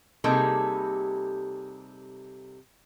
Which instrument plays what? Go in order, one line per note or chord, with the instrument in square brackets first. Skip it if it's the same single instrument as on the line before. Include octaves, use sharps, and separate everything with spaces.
[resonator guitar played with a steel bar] C3 G3 A#3 D#4 G#4 A4